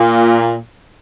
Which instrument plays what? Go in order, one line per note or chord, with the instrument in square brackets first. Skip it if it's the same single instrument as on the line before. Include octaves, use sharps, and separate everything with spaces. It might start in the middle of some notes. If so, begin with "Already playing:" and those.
Already playing: [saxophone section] A#2